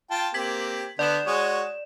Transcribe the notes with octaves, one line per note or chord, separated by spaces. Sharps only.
F4 G5 A5
A#3 C4 G4 G#6 B6 F#7
D3 B3 D5 E7
G#3 F#4 C#5